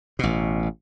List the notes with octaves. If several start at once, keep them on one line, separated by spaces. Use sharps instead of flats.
A1 B2